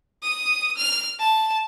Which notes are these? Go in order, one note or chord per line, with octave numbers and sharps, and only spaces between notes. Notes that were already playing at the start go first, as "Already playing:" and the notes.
D#6
F6
A5